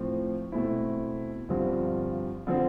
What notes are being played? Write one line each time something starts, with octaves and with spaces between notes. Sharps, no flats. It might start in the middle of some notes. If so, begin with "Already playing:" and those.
Already playing: A2 F3 C4
B2 A3 C4 E4
G1 G2 D3 F3 C4
D3 F3 C4